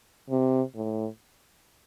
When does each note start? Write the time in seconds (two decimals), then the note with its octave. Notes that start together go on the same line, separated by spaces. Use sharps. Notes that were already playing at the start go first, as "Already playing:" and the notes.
0.30 C3
0.75 A2